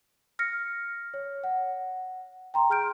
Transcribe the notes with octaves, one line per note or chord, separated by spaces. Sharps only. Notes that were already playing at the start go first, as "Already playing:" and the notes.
F6 A#6 C#7
C#5
F#5
G5 A#5 C6
G#4 F6 G6 D7